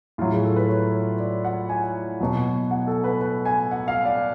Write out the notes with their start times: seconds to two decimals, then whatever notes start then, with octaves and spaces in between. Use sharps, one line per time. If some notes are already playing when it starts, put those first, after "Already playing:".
0.18 A2 F#3 F4
0.32 G#4
0.44 A4
0.56 B4
0.69 C#5
1.19 D5
1.45 F#5
1.69 G#5
2.21 B2 F#3
2.71 F#5
2.87 A4
3.04 B4
3.21 B4
3.45 G#5
3.71 F#5
3.88 F5
4.05 D5